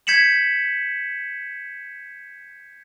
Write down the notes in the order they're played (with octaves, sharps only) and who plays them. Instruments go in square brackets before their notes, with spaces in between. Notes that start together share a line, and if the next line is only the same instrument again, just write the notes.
[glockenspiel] G6 G#6 B6 C#7 E7 F#7